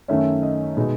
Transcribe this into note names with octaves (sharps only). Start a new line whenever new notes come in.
F#2 D#3 A3 C#4 E5
D#5
B2 G#3 D#4